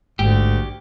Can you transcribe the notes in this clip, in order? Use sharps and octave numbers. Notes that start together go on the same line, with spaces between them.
A1 D2 G#2 G4